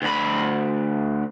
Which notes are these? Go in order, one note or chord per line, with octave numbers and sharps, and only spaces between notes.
D2 B5